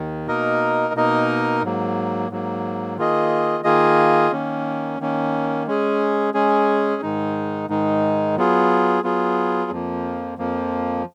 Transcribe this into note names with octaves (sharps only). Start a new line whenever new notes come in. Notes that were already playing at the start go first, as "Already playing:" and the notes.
Already playing: D#2 D#3
B2 A#3 D#4 A#4 D#5
B2 A#3 D#4 A#4 D#5
G#2 F#3 A#3
G#2 F#3 A#3
D#3 A#3 F4 G#4 D#5
D#3 A#3 F4 G#4 D#5
D#3 A#3 C#4
D#3 A#3 C#4
G#3 C#4 G#4
G#3 C#4 G#4
G#2 D#3 G#3 D#4
G#2 D#3 G#3 D#4
F#3 B3 F4 G#4
F#3 B3 F4 G#4
F2 F3 A#3
F2 F3 A#3